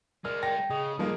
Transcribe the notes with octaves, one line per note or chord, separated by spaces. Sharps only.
G#3 F4 A#4 D5 F6
G5 A#6
C#3 G#4 D#5 D#6
G2 F3 G#3 A#3 D#4 A4